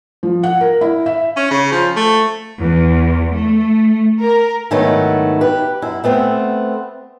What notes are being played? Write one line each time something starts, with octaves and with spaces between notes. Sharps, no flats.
F3
F#5
A#4
E4
E5
C#4
C#3
F3
A3
E2
A3
A#4
G#2 D#3 F#3 A3 B3 E4
G4 B4
F#2 E4
A3 B3 C4